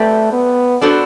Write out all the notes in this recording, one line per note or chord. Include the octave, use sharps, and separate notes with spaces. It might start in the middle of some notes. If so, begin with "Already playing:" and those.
Already playing: F#3 A3 C4 G4 B4 D5
B3
B3 D4 F#4 A4 C5